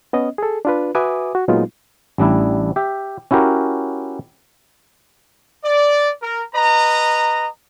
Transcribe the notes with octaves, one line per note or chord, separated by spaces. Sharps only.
B3 C#4 D#5
G#4 A4
D4 F4 B4
F#4 B4 E5 G#5 D6 D#6
F#4
A#2 F#3 G#3 B3 D#4 F4
A1 G3 D4 E4
G4 E5
C#4 E4 F#4 G4 A#4
D5
A#4
B4 D#5 A#5